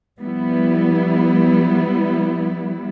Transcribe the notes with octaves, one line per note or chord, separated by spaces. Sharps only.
F3 G3 B3 E4